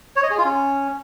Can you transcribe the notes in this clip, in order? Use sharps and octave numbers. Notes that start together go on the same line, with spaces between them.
C#5
D#5
G#4
F4
C#4